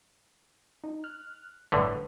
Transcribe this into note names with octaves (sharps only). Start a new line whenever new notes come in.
D#4
F6 F#6
G1 A2 D3 B4